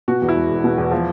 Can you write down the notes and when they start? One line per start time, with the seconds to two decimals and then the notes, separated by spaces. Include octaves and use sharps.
0.08 B2 F#4
0.22 E2
0.29 E4
0.36 E1
0.50 E1
0.64 B2
0.78 E2
0.91 F3